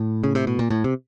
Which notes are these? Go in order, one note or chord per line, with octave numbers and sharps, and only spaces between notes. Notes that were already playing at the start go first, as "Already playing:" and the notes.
Already playing: A2
C#3
C3
B2
A#2
A2
C3